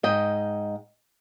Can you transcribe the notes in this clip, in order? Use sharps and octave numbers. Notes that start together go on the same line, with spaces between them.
G#2 D#5 G5